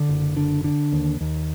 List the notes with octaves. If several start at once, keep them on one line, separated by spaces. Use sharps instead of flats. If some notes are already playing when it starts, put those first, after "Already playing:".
Already playing: D3
F#1
D3
D3
D#2
D#2